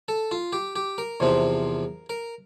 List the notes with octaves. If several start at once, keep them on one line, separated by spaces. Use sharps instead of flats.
A4
F4
G4
G4
A#4
E2 C3 F3 C4
A#4